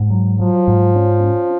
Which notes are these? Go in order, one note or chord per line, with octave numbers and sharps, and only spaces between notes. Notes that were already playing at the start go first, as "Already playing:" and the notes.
Already playing: G#2
F#3
F3 F#3
G#2
C#4
C#4